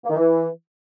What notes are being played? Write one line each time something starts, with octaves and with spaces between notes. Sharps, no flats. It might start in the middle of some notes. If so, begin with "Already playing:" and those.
A#3
D#3
E3